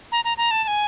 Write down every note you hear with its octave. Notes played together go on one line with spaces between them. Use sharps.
A#5
A#5
A#5
A5
A5
G#5